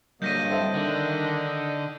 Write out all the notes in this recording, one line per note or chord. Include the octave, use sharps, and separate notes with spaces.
G2 D3 F#3 A#3 D#5 G6 A#6 D#7
C4 E4 A4
D3 D#3 D4